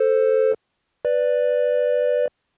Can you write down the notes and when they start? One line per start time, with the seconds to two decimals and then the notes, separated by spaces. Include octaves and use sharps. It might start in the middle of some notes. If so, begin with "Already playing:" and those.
Already playing: A4 C5
1.05 B4 D5